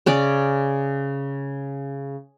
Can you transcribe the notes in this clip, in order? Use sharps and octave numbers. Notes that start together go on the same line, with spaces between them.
C#3 C#4 D5